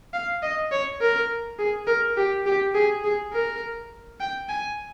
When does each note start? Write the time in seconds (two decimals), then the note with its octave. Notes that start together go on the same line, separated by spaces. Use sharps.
0.13 F5
0.43 D#5
0.72 C#5
1.01 A#4
1.59 G#4
1.87 A#4
2.17 G4
2.46 G4
2.74 G#4
3.04 G#4
3.33 A#4
4.20 G5
4.49 G#5